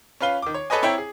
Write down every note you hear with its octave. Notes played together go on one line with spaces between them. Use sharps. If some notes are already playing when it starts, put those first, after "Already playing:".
C#4 F4 B4 F5 G7
D#3 D6
C#5
A4 B4 C#5 D#5 G#5
C4 E4 C#5 E5 G5 A#5
G#4